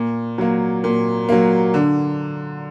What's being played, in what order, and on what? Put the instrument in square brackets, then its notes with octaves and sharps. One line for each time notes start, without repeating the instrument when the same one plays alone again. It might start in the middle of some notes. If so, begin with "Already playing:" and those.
Already playing: [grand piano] A#2
F#3 A#3
A#2
F#3 A#3
D3